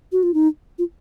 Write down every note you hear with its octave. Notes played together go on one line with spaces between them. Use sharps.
F#4
F4
D#4
F4